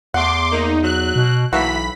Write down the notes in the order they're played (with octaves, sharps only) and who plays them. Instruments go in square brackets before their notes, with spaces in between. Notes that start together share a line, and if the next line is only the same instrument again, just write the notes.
[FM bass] E2 [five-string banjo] A3 F#5 [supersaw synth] C6 D6
[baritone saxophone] A#3 [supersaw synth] D#4
[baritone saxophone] F#3 [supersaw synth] F#6
[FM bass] B2
[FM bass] B1 [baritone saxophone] E3 [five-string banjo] A3 A#3 F#4 [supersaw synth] B5 B6